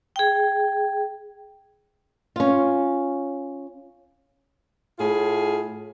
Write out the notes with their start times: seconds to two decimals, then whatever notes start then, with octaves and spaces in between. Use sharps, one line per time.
0.16 G#4 G5
2.36 C#4 F4
4.99 A2 F4 G#4